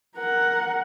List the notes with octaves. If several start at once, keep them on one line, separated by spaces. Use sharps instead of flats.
A#4 F#5